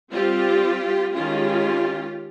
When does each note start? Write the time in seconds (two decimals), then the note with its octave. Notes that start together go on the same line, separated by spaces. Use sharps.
0.12 G3 C4 F4 G4
1.15 D#3 G#3 C#4 F4 G4